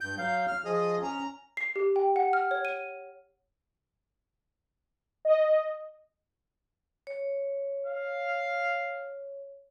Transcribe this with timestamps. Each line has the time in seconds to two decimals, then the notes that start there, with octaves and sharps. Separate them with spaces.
0.01 G2 G6
0.18 F#3 F5 G6
0.47 F6
0.65 F3 G#4 D#5
1.02 C#4 A#5
1.57 C7
1.76 G4
1.96 G5
2.16 F#5
2.33 F6
2.51 C#5
2.65 D#7
5.25 D#5
7.07 C#5
7.87 F5